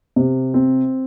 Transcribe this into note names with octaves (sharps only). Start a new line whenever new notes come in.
C3
C4